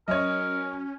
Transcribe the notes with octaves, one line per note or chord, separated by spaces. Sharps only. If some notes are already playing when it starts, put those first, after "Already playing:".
F#3 C#4 A#4 C#5 D#5